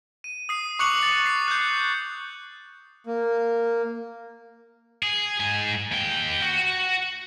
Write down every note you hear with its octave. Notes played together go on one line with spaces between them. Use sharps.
D#7
D#6 C7
C#6 D6 F#6 C#7 F7 F#7
D6 A6 C#7
C7
F#6 G6
A#3
G#4
G#2 G#5
D#2 G5
F#4